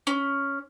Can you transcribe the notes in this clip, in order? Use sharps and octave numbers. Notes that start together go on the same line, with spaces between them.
C#4